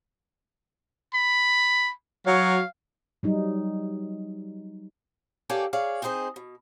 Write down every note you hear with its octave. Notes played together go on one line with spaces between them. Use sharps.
B5
F#3 C#5 F5
F#3 G3 D#4
A#3 G4 A4 C#5 D5 G#5
G#4 C#5 D5 F5
C4 D#4 G#4 C5 D#5
B2